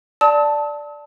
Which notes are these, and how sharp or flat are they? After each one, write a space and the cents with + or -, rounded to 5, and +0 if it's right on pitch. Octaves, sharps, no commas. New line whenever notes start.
D5 +0 A5 +0 E6 -45